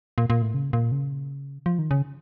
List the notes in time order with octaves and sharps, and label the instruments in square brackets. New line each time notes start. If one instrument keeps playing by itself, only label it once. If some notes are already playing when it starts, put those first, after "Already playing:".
[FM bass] A#2
A#2
A2
C#3
A#2
C#3
F3
D#3
C#3